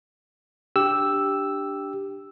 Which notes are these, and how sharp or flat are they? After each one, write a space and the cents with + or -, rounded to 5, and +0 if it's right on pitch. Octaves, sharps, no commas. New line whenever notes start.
D4 +0 G4 +0 E6 +0